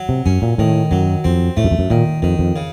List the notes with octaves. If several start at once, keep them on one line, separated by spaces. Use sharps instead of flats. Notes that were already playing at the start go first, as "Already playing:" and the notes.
Already playing: F#3
C3
F#2 C#4
A#2
A2 D#3
F#2 F#3
F2 C4
A2 A3
F#2
F2
F#2
A#2 D#3
F2 D#3
F2
C#3